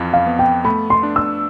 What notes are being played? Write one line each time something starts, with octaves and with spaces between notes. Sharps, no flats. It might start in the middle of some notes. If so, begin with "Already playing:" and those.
Already playing: F2 E3 F4
F5
B3
G5
A3 B5
C6
D4
E6